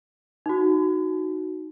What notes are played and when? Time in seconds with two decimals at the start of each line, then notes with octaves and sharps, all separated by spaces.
0.46 D#4 F#4